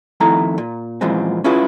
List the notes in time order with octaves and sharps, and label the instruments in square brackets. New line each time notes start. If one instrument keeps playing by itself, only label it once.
[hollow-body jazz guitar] F2 D#3 A3 E4 A#5
A#2
F#2 A#2 E3 F3 G#3 C4
C#4 E4 F4 G#4 B4